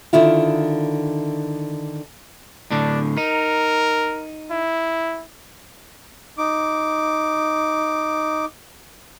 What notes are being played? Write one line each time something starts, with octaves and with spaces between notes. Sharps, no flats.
D3 D#3 E4 F4
A2 D3 D4
D#4 A#4
E4
D#4 D6